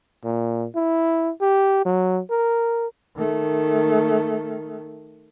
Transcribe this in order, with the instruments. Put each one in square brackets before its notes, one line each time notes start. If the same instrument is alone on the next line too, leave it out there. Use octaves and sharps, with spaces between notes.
[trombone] A#2
E4
G4
F#3
A#4
[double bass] D#3 A3